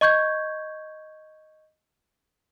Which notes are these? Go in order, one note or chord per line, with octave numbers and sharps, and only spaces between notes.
D#5 C#6 G6 G#6